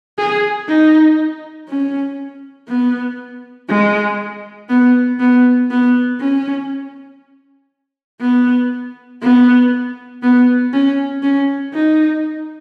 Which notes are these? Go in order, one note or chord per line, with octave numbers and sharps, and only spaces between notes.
G#4
D#4
C#4
B3
G#3
B3
B3
B3
C#4
B3
B3
B3
C#4
C#4
D#4